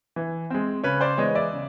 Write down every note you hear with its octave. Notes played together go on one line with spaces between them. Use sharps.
E3
G#3 C4
C#3 B4 C#5
C5 D5
E3 G#3 B3 C#5 D#5
D5 E5
C#3